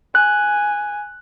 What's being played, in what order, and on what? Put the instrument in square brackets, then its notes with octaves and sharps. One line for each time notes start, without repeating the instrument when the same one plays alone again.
[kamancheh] G#5 [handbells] F#6